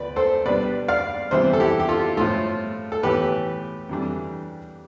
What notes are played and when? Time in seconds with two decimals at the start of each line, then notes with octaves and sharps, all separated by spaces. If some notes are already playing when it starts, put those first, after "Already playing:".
Already playing: D2 F3 B3 B4 D5
0.16 A4 C5
0.45 B2 G3 B3 D4 B4 D5
0.88 D5 F5
1.31 C3 E3 G3 B3 D4 C5 E5
1.53 A4
1.60 E4 G4
1.80 G4
1.89 F4 A4
2.17 A2 F3 A3 F4 A4
2.92 A4
3.03 A2 E3 B3 G4 B4
3.89 F2 E3 G3 D4